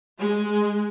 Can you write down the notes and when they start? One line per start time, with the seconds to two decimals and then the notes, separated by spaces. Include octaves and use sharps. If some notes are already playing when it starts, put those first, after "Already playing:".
0.19 G#3